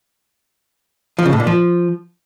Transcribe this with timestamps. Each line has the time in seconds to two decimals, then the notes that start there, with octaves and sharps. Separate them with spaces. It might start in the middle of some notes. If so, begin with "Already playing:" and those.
1.19 F3
1.26 C#3
1.33 A2
1.40 A#2
1.47 F3